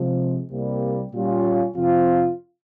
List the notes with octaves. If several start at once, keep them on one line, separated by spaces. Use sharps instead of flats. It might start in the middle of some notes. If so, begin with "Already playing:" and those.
Already playing: C3 F3 G#3
C2 C3 G3 A#3
A#2 G3 C#4 F4
F2 C3 F3 C4 F4